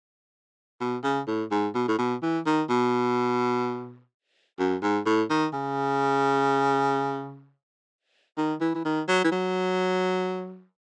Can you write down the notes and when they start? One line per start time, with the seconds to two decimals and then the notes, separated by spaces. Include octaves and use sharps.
0.81 B2
1.04 C#3
1.28 A2
1.51 G#2
1.75 B2
1.88 A2
1.99 B2
2.23 E3
2.46 D#3
2.70 B2
4.59 F#2
4.83 G#2
5.06 A2
5.30 D#3
5.53 C#3
8.38 D#3
8.61 E3
8.75 E3
8.85 D#3
9.08 F#3
9.24 E3
9.32 F#3